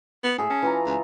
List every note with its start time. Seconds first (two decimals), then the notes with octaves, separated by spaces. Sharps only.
0.24 B3
0.38 A2 G#4 E5
0.50 C#4 A5
0.62 E3 F4 A#5
0.86 C#2